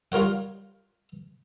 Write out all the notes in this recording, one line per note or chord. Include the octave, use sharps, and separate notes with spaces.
G3 F4 A#4 C#5 F#5